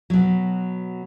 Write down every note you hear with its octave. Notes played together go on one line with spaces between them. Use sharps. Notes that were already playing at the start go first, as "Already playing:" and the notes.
B2 F#3